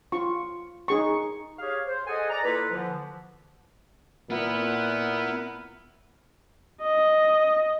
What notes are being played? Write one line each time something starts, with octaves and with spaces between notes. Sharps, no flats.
F4 C#6
D#4 G#4 C#6
G4 G#4 C#5 F5
C5
G#4 A4 C5 D#5 F#5 G#5
D5 A#5
A#3 E4 F4 A4 B4
D3 E3 F3
A#2 B3 E4 A#4 B4
D#5